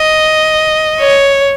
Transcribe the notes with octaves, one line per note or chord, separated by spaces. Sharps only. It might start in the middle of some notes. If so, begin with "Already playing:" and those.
Already playing: D#5
C#5